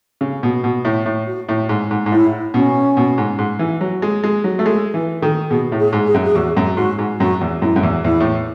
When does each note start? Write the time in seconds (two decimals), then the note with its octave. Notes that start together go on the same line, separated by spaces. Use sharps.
0.21 C#3
0.43 B2
0.64 B2
0.85 A2
1.06 A2
1.27 F#4
1.49 A2
1.69 G#2
1.91 G#2
2.06 G#2
2.12 A2 E4
2.54 B2 C#4
2.97 B2
3.18 G#2
3.38 G#2
3.59 E3
3.81 F#3
4.02 G#3
4.24 G#3
4.44 F#3
4.59 A3
4.66 G#3 A4
4.93 E3 B4
5.22 D#3 A4
5.50 B2 G#4
5.72 A2
5.79 G#4
5.93 G#2
6.07 G#4
6.14 F#2
6.25 G#4
6.35 E2 F#4
6.57 F#2
6.77 G#2 F#4
6.99 G#2
7.19 F#2 F#4
7.41 E2
7.62 F#2 E4
7.76 F#2
7.83 E2
8.05 E2 E4
8.20 A2